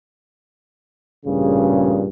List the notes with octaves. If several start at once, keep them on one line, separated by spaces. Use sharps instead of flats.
A1 G2 A#2 C#3 G#4